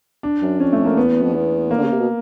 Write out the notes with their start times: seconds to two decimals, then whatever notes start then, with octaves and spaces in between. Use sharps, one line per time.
0.23 D4
0.42 F#2
0.60 F2 C#4
0.73 A3
0.85 A#3
0.96 E2 B3
1.22 F2
1.34 E2
1.71 A#3
1.78 D3
1.84 C#3
1.92 C3
1.99 B2